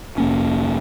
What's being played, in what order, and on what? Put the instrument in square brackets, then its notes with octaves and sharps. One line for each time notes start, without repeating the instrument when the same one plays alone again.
[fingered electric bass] F1 A#3 C#4